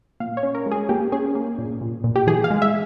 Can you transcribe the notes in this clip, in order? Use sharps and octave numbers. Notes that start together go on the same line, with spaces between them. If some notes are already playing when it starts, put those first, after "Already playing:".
A#2 F5
C#5
C#4
A#4
G#3
G#4
A#3 G4
C#4 G#4
A#3
A#2
A#2
A#2
G4
E3 G#4
F5
G#3
E5